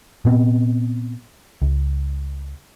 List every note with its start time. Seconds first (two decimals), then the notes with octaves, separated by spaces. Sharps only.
0.25 A#2 B3 C4
1.62 C#2